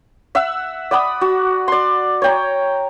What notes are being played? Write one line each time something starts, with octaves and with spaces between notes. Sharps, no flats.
E5 F#5 E6
D5 F#5 B5 D#6
F#4
D5 C6
C#5 G5 A#5